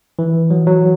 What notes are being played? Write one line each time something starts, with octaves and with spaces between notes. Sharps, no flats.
E3
F#3
F#3